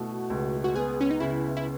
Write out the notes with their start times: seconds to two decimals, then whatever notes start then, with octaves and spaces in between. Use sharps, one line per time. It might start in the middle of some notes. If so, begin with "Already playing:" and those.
Already playing: B2 A3 E4 F#4
0.30 C#2
0.64 F#4
0.76 B3 G#4
1.01 C#4
1.11 D#4
1.20 C#3 E4
1.57 E4